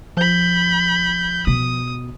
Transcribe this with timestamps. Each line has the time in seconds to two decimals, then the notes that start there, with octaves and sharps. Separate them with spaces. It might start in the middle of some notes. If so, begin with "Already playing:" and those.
0.17 F3 B5 G6
1.47 B2 D#6